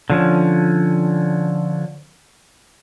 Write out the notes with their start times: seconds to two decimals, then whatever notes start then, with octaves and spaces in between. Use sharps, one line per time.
0.10 D3 F3 C#4